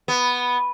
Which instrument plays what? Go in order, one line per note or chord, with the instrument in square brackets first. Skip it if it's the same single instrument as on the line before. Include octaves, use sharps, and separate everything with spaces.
[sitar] B3